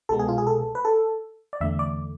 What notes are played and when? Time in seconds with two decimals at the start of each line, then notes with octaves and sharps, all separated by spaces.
0.09 C2 B2 G#3 B3 A4
0.19 G#4
0.28 F4
0.38 G#4
0.47 A4
0.75 B4
0.85 A4
1.53 D5
1.61 E2 D3 A3 E5
1.79 D5